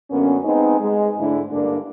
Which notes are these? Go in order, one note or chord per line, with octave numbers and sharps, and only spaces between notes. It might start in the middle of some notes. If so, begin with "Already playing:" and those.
F#2 D3 A#3 B3 C#4
G#3 B3 C4 D#4
G#3
G#2 D3 G#3 A3 D4 E4
G2 D3 A#3 D4